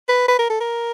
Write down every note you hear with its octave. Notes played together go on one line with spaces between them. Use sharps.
B4
B4
A#4
A4
A#4